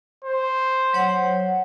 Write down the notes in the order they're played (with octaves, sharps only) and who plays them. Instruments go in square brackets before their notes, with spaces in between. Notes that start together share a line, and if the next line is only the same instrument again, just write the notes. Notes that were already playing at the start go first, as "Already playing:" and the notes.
[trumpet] C5
[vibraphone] F#3 C#5 F#5